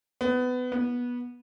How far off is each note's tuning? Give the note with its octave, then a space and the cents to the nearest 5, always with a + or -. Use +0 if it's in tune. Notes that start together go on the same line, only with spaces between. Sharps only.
B3 +20
B3 -20